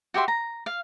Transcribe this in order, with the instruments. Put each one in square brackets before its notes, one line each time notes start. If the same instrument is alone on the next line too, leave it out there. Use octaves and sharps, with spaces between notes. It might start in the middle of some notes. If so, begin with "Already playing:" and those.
[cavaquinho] F#4 G4 E5 C6
A#5
F5